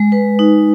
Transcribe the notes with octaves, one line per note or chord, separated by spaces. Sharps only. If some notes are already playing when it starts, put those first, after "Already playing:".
Already playing: G#3
B4
D#4